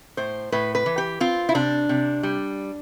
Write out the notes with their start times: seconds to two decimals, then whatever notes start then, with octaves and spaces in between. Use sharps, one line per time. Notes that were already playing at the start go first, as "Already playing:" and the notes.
0.17 A2 C5
0.52 A2 B4
0.75 B4
0.86 E3
0.98 G4
1.20 C4 F4
1.49 E4
1.55 C3 D4
1.89 C3
2.23 G3